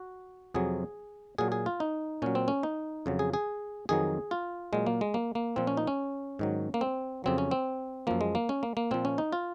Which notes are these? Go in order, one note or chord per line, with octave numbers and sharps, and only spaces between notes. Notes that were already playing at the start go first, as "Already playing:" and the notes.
Already playing: F#4
F2 C3 F#3 G#4
A#2 F#3 G#4
G#4
F4
D#4
A#2 F#3 C#4
C4
C#4
D#4
F2 C#3 F#3
G#4
G#4
F2 D#3 F#3 G#4
F4
A#2 F#3 G#3
A#3
G#3
A#3
A#3
A#2 F3 C4
C#4
D#4
C#4
G#2 D#3 F#3
A#3
C4
F2 C#3 F#3 C4
C#4
C4
F#2 F3 A#3
G#3
A#3
C#4
A#3
A#3
A#2 F3 C4
C#4
D#4
F4